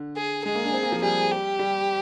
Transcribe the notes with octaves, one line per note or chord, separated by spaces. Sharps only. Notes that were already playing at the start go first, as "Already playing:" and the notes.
Already playing: D3
G#4
G#3 G#4
A#3
D4
C4
A#3
F3
G3 G#4
G4
G3